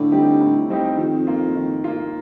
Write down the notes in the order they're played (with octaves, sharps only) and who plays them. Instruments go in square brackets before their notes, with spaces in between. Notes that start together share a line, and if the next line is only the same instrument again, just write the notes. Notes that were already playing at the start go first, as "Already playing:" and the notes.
Already playing: [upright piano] A2 [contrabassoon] D3
[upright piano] G3 C4 D#4 G4
A2
G3 C4 D#4 G4
[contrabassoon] F2 [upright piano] D#3
[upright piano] A#3 F4
D#3
A#3 F4